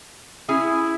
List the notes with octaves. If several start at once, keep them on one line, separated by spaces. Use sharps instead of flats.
C#4 E4 G#4 G#5